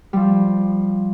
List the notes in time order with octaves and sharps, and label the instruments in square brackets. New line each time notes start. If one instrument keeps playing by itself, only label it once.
[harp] F3 G3